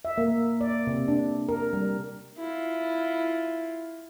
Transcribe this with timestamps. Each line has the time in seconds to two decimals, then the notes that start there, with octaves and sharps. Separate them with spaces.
0.05 E5
0.18 A#3
0.61 D5
0.87 C3
1.08 D4
1.49 A#4
1.73 G3
2.38 E4 F4